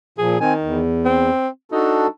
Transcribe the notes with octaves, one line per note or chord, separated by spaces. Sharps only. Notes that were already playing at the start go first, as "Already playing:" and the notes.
A#2 F3 G#4
D#3 C4 G#5
E2
C4
D4 D#4 F#4 A4